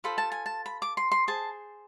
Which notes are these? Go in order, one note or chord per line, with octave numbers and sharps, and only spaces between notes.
F4 A4 C5 B5
A5
G#5
A5
B5
D6
C6
C6
G#4 C5 A5